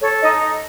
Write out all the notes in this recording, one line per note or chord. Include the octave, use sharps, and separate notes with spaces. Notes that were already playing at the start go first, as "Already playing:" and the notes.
A4 C#5
D#4 D#5